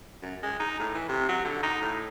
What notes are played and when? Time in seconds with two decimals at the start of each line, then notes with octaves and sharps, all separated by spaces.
0.22 F#2
0.42 G#3
0.59 D#4
0.79 A2
0.94 E3
1.08 C3
1.28 F#3
1.45 D3
1.63 D#4
1.81 A2